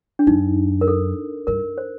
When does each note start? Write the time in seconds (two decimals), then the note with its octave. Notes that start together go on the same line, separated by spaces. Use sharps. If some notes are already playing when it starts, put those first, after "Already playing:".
0.19 D4
0.27 F#2 D#4
0.81 A#4
0.88 A4
1.47 G2 A#4
1.78 C5